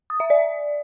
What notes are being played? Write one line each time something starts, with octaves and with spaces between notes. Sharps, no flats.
D#6
E5
D5